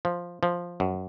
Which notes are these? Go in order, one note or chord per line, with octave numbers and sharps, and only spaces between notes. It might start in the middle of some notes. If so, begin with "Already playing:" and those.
F3
F3
F#2